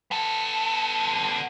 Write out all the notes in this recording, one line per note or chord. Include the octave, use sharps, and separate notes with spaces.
B3 A4